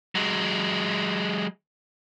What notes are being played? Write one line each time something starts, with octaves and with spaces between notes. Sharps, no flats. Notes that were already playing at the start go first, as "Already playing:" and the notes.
F#3 G#3